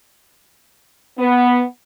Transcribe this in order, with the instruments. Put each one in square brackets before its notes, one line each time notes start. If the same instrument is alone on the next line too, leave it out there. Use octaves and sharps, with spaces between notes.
[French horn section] B3